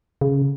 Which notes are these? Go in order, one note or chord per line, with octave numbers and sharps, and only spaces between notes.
C#3